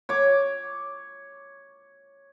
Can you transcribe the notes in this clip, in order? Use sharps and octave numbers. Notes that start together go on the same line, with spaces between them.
C#5 D6